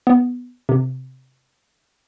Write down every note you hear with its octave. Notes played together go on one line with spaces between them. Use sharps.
B3
C3